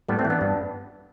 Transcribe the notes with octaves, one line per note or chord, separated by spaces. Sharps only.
A2 G3 B3
A3 C4
E3
B3 D4
G2